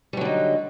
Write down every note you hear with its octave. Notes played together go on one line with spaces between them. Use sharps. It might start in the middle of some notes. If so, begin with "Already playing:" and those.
D3 F#3 G3 D#4